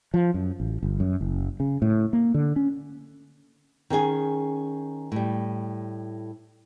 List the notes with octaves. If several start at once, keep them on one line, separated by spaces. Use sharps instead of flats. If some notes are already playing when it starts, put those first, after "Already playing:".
F3
F#2
A1
G1
F#2
F#1
C#3
A2
A#3
D3
C#4
D#3 C#4 G#4 G#5
A2 G3